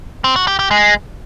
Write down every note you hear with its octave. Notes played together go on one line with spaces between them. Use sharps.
C4
F#4
G4
G4
G#3